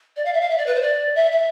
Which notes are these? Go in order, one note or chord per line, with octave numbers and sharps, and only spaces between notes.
D5
F5
E5
F5
E5
D5
B4
C5
D5
E5
E5